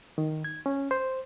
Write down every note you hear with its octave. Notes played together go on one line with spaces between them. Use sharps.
D#3
G#6
C#4
C5